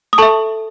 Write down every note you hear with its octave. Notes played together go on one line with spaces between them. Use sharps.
D#6
A4 E5 A5 C#6